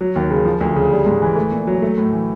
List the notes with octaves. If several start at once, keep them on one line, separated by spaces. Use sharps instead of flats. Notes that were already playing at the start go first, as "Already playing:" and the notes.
F#3
D#2
C#3
F3
D2
C#3
G3
G#2
E3
A3
A#2
F#3
A3
A2
E3